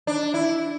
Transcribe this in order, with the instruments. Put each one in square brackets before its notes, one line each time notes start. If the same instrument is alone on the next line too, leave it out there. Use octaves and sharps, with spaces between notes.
[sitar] D4
E4